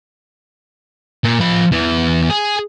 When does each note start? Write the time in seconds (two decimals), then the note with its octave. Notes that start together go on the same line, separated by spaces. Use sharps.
1.24 A#2
1.40 F3 B5
1.72 E2 E3
2.30 G#4